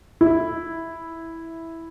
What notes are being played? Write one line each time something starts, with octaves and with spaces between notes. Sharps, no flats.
E4